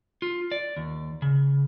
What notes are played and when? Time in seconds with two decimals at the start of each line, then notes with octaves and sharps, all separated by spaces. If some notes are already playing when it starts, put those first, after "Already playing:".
0.22 F4
0.52 D5
0.77 D#2
1.22 C#3